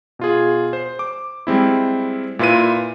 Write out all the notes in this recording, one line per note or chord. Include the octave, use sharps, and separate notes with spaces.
B2 F4 G#4
C5
D6
G3 G#3 C4 E4
A#2 E4 F4 B4 D#7